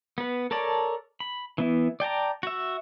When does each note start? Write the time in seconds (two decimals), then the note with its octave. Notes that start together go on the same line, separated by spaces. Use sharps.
0.18 B3 B4
0.51 A4 A#4 C#5 D5 A5
1.20 B5
1.58 E3 B3 E4
2.00 D5 G5 A5 A#5
2.43 F#4 E5